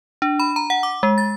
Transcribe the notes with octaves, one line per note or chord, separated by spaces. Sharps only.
D4
B5
A#5
F#5
D6
G#3
A6